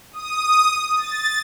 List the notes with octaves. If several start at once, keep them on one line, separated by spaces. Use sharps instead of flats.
D#6
A6